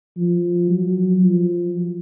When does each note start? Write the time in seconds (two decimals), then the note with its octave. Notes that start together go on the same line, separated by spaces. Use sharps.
0.17 F3
0.70 F#3
1.23 F3